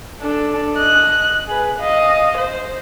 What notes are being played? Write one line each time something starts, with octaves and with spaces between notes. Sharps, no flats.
D4 A4
D#5 F#6
G#4 B4
D#5 F5
C5